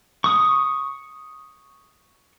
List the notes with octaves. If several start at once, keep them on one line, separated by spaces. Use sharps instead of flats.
C#6 D#6